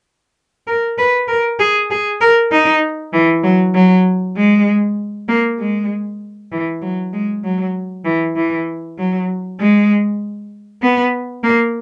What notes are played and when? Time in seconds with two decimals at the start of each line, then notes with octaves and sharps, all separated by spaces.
0.67 A#4
0.98 B4
1.28 A#4
1.59 G#4
1.90 G#4
2.21 A#4
2.51 D#4
3.13 E3
3.43 F#3
3.74 F#3
4.37 G#3
5.28 A#3
5.59 G#3
6.52 E3
6.82 F#3
7.13 G#3
7.44 F#3
8.05 E3
8.35 E3
8.98 F#3
9.60 G#3
10.82 B3
11.43 A#3